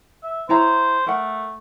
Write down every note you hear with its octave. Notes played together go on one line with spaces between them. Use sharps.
E5
E4 C5 C#5 A#5
A3 A#4 F#5